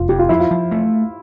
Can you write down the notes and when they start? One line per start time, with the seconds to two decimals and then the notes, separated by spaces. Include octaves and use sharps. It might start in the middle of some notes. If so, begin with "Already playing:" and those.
Already playing: F1 F4
0.08 F2 G4
0.19 F4
0.29 F3 E4
0.40 F4
0.51 F3
0.71 A3